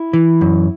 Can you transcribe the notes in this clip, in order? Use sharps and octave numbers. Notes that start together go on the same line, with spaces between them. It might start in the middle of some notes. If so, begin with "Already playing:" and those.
Already playing: E4
E3
F#2